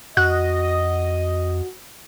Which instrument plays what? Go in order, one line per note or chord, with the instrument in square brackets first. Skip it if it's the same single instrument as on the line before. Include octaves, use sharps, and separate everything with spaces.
[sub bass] F2 [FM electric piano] F#4 [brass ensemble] D#5 [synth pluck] F#6